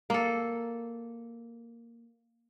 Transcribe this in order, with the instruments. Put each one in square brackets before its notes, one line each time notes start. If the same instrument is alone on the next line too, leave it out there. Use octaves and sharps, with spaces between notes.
[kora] A#3 A4